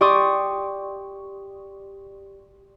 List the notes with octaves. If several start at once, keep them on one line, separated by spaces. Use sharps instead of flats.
G4 D5 C6 C#6 D#6